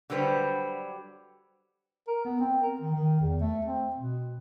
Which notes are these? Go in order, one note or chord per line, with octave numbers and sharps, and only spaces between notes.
D3 F#3 G3 B4 C5
A#4
B3
C4
A#4
D#3
D#3
E2
A3
C4
B2